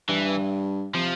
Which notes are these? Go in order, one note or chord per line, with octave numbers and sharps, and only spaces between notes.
G2 E3
C3 F3